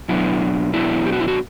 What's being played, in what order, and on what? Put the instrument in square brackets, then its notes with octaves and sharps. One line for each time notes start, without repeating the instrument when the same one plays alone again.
[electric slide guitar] B2 F#3 B3 D4 E4
B2 F#3 B3 D4 E4
G4
F#4
E4
F#4